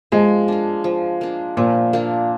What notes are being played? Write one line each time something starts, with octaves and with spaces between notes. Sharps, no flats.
F3 G#3
A#3 D4
F3
A#3 D4
A#2 F3
A#3 D4